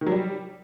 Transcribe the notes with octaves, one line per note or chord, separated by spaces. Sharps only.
D#3
F#3
G3